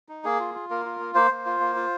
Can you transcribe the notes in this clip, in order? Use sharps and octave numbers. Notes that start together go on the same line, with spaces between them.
D#4
A#3 G#4
F4
F4
A#3 A#4
F4
A#3
A#3 C5
A#3
F4
A#3
F4